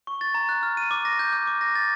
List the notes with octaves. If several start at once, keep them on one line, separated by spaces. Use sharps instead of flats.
C#6
A6
A#5
F#6
F6
D#7
D6
A#6
G6
D6
D6
A#6
A6